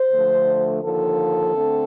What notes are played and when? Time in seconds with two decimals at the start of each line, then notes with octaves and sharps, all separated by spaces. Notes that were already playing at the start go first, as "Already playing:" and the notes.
Already playing: C5
0.11 D2 D3 F3 A3
0.83 D#2 D3 F3 A4
1.54 D3 A3 C4